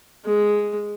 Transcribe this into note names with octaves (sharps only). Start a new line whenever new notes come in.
G#3